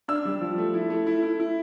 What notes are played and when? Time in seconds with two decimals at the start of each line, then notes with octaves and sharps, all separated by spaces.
0.08 D4 E6
0.25 G3
0.41 F3
0.58 A3
0.74 E4
0.90 A3
1.07 E4
1.23 E4
1.40 E4